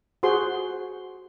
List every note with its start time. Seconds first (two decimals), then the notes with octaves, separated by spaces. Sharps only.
0.23 F#4 G#4 C5 C6